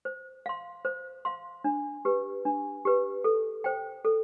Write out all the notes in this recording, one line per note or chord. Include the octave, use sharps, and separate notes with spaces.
C5
F5 C6
C5
F5 C6
D4
G4 B4
D4
G4 B4
A4
C5 G5
A4